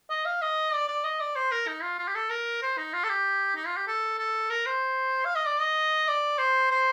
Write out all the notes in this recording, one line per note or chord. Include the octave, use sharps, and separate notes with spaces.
D#5
F5
D#5
D5
D5
D#5
D5
C5
A#4
D#4
F4
F4
G4
A4
A#4
C5
D#4
F4
A4
G4
D#4
F4
G4
A4
A4
A#4
C5
F5
D#5
D5
D#5
D5
C5
C5